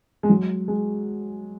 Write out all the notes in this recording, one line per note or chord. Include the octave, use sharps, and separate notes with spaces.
G#3
F#3
G#3